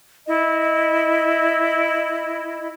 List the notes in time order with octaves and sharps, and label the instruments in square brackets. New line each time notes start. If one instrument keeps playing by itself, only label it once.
[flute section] E4 D#5